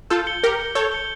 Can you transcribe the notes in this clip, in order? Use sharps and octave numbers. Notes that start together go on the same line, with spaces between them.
F4 A4 G6
C#7 G7
G4 A#4 G6
C#7 G7
A4 C#5 G6
C#7 G7